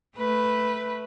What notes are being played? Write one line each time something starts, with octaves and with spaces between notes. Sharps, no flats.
A3 B4